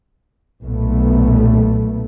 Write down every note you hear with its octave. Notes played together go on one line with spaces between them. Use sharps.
B1 A#2 A3 B3